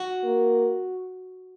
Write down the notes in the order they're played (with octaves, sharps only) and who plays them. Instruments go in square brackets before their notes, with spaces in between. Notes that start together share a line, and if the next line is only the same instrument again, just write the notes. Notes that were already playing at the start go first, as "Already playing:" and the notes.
Already playing: [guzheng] F#4
[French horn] A#3